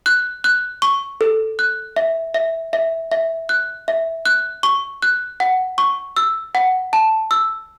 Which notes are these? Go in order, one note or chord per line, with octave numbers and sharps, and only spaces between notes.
F#6
F#6
C#6
A4
F#6
E5
E5
E5
E5
F#6
E5
F#6
C#6
F#6
F#5
C#6
E6
F#5
A5
E6